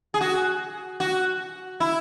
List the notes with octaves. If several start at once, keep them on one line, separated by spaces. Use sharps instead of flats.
G#4
F#4
F#4
E4